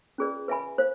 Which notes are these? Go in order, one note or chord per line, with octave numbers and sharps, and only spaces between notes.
C#4 F4 G#4 B4 D5
B4 E5 G#5 B5
C5 F5